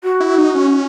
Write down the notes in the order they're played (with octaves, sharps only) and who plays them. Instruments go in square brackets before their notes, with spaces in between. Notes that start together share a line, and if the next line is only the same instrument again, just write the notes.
[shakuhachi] F#4
[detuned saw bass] E4
D#4
C#4